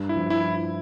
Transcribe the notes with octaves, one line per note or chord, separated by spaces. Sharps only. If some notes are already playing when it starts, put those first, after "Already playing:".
Already playing: G2
E4
F3
E4